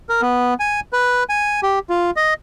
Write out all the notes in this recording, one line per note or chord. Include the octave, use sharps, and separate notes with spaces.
A#4
B3
G#5
B4
G#5
G4
F4
D#5